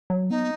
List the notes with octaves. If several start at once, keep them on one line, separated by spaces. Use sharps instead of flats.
F#3
B3 D#4